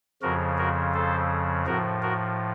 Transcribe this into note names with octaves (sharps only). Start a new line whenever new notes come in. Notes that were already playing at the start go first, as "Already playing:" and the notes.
F2 C#3 F3 F#4 A#4
F#4 A#4
A4 C5
A2 F3 F#4 A#4
F#4 A#4